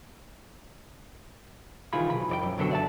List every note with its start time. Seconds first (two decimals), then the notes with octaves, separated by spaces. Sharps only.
1.93 C2 D#3 E3 F4 G#4 B5
2.10 B1 B5
2.29 F2 D5 G5
2.43 F#2
2.58 B1 B2 D3 F#3 A4 G5
2.71 D5 E5 A5